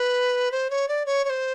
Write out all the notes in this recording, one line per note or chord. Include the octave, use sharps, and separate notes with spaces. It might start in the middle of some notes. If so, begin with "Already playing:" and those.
Already playing: B4
C5
C#5
D5
C#5
C#5
C5